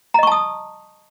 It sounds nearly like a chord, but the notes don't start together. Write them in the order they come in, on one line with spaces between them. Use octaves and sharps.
A#5 D#5 C#6 A5 D#6